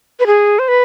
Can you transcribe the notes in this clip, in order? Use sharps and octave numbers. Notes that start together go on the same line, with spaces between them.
B4
G#4
C5
B4